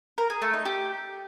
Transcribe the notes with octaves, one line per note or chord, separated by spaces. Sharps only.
A#4
G#4
A3
D#4
G4